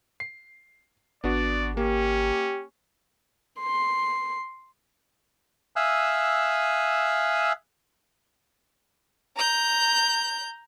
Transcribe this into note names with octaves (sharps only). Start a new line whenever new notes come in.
C7
G#1 B3 D4 F#4 D5
A#3 C#4 G4
C6
E5 F5 G#5 D#6 E6 F#6
A#5 G6